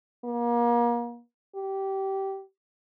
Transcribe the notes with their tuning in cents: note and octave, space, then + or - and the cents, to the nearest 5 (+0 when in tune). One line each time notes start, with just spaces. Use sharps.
A#3 +35
G4 -20